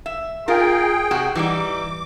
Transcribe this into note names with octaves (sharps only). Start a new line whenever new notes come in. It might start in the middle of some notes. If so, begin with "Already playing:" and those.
E5
F4 G#4 A#4 G5
C3 F#4
E3 G3 D#4 D6